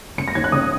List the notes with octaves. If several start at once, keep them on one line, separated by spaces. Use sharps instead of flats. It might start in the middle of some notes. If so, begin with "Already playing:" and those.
C#3 C#7
A#6
D#2 G#6
F#6
C#3 D#6